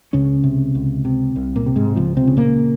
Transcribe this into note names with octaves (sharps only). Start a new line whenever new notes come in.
C#2 C#3 C#4
C3
C#2
C3
C2
A#2 A#3
C3
G#2 G#3
C#2 F3
C3 C4
C#3
A#2 A#3